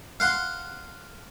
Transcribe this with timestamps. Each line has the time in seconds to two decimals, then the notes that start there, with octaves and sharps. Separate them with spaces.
0.20 F5 F#5 C6